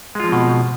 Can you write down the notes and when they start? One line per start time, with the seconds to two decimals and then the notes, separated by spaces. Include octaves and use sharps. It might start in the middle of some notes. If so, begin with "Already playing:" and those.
0.15 G#3
0.20 F4
0.24 F3
0.28 C4
0.32 B2